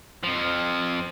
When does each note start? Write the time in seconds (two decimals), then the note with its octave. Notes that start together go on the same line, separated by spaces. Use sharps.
0.24 F2 F3